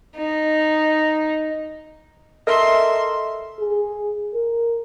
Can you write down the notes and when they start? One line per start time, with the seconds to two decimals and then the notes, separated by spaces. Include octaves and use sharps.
0.17 D#4
2.47 A4 A#4 D#5 E5 C6
3.60 G#4
4.34 A#4